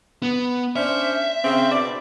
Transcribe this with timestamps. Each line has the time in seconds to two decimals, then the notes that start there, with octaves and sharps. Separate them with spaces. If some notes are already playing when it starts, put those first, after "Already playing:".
0.22 B3
0.76 C#4 D4 C5 E5
1.44 C#3 C4
1.71 B2 D4 D5